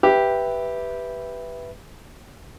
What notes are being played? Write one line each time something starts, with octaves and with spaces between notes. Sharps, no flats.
G4 B4 E5